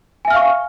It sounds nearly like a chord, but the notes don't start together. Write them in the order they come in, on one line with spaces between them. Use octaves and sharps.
G#5 E5 F6 F5 C#6